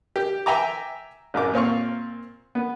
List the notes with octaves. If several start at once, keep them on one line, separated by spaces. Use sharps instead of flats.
G4
E5 G5 G#5 A#5 D6
A1 F#2 D6
A#2 C4 F5 C#6
B3